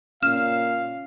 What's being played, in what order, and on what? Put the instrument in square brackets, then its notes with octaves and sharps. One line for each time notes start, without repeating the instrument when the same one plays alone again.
[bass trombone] A#2 [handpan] C#4 [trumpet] F5 [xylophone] F6 E7